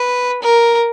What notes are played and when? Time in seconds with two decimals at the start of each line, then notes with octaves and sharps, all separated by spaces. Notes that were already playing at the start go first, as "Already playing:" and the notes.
Already playing: B4
0.42 A#4